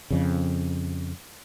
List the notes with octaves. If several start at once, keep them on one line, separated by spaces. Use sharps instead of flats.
F2 C#3